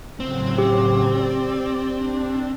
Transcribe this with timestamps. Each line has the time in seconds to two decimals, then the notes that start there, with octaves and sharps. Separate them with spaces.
0.20 A2 C#3 F#3 C4
0.58 G4
1.03 D5
1.92 D4